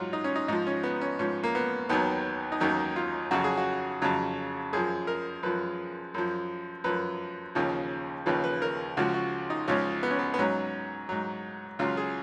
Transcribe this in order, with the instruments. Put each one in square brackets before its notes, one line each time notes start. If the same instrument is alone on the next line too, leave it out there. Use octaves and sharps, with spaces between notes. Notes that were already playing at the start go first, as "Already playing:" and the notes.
Already playing: [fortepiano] G#2 F#3 F4
D#4
C#4
D#4
G#2 F3 D#4
C#4
B3
C#4
G#2 F3 C#4
A#3
B3
D#2 D#3 F#3 B3
D#4
D#2 D#3 F#3 C#4
F4
F2 C#3 F#3 F#4
G#4
F#4
F2 C#3 F#3
F#2 F3 G#4
A#4
F#2 F3 B4
F#2 F3
F#2 F3 B4
D#2 C#3 F3
D#2 C#3 F3 B4
B4
A#4
C#2 C#3 F3 F#4
F#4
D#4
C#2 C#3 F3 C#4
B3
C#4
B3
B3
G#2 F#3 C#4
G#2 F#3
C#2 C#3 F#3 F4
G#4